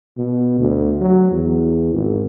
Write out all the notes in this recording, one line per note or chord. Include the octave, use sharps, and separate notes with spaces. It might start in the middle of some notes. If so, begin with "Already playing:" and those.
B2
D2
F#3
E2
G#1